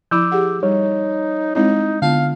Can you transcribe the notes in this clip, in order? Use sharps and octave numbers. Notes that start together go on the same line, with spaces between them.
F3 E4 B5 D6 E6 G6
G4 G#4 F#5
G3 D#4 C#5
G#3 C4 D#4 E4
D3 B3 F4 F5 A5